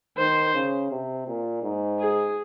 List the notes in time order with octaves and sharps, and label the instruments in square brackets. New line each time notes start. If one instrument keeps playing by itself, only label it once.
[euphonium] D#3 [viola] C5
[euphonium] C#3
C3
A#2
G#2
[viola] G#4